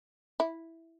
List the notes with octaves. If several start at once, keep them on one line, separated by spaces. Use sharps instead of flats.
E4